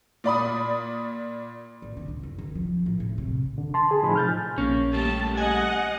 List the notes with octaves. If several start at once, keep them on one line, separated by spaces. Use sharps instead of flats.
A#2 D5 B5 D#6
A1
D3
C#2
F#1
D#3
F3
A2
A2
C3
D3
A5 C6
G#4
A2 C3 F3 D#4 G#5 B5
F6 G6 A6
A#1 A#3 C#4
G3 A3 G4 A5
D#5 F#5 G#5